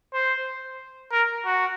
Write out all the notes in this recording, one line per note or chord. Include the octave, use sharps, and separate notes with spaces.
C5
A#4
F#4